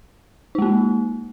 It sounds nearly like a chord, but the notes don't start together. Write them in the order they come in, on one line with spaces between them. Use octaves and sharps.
D#4 G#3 A#3